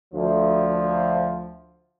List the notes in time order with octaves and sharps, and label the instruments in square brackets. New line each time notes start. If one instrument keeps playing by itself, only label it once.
[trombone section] D2 F3